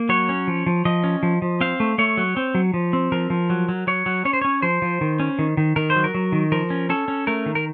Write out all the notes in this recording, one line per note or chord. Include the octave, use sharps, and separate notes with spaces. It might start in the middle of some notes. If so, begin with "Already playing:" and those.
Already playing: A#3
F#3 C#5
C#4
F3
F3
F3 D#5
C#4
F3
F3
C4 F5
A3
A3 C#5
F#3
C4
F#3
F3
C4
F3 A#4
F3
F#3
F#3
F#3 C#5
F#3
C#4 C#5
C5
C#4 C#5
F3 C5
F3
D#3
C#4
D#3
D#3
D#3 A#4
C5
F#3
A#4
F#3
D#3
F3 A#4
C#4
C#4 A4
C#4
A3 A#4
D#3
A#4